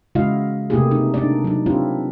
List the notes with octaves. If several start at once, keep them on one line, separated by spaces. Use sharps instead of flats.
C#3 G#3 E4 F#4 D#5 F5
C3 A3 A#3 E4 G4 G#4
D#4
D4 D#4 D5
F#3 D#4
C4 D4 E4 F4 G4